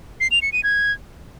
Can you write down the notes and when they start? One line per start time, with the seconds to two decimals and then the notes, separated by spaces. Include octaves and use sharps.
0.20 C7
0.31 F7
0.42 C#7
0.53 D#7
0.64 G#6